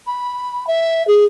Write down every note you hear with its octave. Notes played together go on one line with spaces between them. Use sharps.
B5
E5
G#4